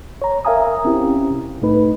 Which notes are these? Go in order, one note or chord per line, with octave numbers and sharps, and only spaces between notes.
C#5 A#5
A#4 E5 F5 G#5 A#5 D#6
C4 C#4 E4 G4
C2
A2 A3 D#4 B4